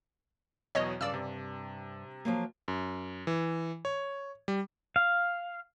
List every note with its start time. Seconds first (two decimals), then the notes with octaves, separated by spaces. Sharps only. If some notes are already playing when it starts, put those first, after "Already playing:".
0.75 E2 B2 F#3 C#5 D#5
1.01 G2 C#3 D5 F5 E6
1.14 C3
2.25 F3 F#3 A#3
2.68 F#2
3.27 E3
3.85 C#5
4.48 G3
4.96 F5